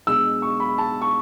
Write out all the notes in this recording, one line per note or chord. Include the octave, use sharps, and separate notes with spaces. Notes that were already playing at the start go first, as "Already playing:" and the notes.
B2 G#3 D4 E6
C#6
B5
A5
C#6